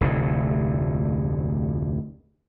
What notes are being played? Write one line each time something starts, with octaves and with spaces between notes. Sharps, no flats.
F1 D2 A2 C3